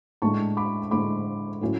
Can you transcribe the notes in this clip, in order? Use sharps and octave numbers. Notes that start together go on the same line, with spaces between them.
A2 G#3 D4 A5 C#6
B5 D6
A2 G#3 D4 B5 D6
A2 F#3 C#4 E4